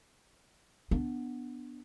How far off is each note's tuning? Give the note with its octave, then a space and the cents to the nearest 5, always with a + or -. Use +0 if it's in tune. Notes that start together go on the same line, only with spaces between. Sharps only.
B3 +0 D4 +0